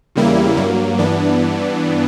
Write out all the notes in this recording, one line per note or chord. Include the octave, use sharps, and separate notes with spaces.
E2 C#3 G3 A#3 E4
G2 F#3 A#3
G2 E3 B3 D4